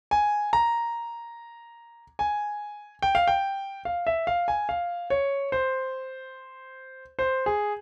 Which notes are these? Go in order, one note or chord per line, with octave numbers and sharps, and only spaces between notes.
G#5
A#5
G#5
G5
F5
G5
F5
E5
F5
G#5
F5
C#5
C5
C5
G#4